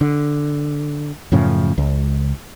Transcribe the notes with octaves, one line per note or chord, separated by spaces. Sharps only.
D3
F#2 A2 C#3 F3
C#2